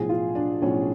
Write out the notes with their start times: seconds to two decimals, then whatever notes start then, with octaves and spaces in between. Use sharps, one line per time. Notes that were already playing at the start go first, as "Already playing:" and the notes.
Already playing: B1 A2 F3 G#4
0.09 F4
0.35 D4
0.62 B1 A2 F3 C#4